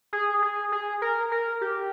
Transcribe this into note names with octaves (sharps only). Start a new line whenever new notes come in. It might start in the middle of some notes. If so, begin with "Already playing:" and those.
G#4
G#4
G#4
A#4
A#4
G4